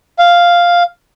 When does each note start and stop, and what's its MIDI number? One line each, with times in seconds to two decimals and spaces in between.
0.19 0.83 77